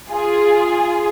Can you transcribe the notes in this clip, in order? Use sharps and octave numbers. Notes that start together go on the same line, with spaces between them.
F4 G#4